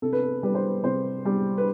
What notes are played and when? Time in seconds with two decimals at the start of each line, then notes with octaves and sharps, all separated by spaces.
0.02 C3 A4
0.13 B4
0.23 A4
0.43 G3 B4
0.55 C5
0.67 B4
0.84 C3 C5
1.25 G3
1.58 B4